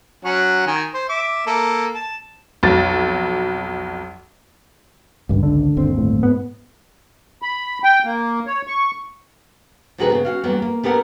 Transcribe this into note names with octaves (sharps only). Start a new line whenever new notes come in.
F#3 C#4 F#5
D#3 G#5
C5
E5 D6
A#3 A4
A5
B1 F2 F#3 A6
G#1 C#2 G2
D3
G1 D#2 C4
A2
G#2 B3
B5
G5
A#3
C#5
C#6
D2 A#2 D#3 F#4 G#4 B4
C#3 B3
C#4 F#4 F5
E2 F#3 G3 A#3 B3
A#3
A3 B3 G4 A#4 F#5